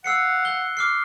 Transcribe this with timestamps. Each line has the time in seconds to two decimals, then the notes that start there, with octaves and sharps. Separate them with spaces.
0.04 C5 F5 F#5 E6 C7 C#7
0.45 F#6 G7
0.77 D6 F6 C7